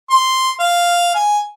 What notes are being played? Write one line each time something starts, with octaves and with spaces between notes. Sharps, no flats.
C6
F5
G#5